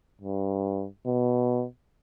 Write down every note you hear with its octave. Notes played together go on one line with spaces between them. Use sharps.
G2
B2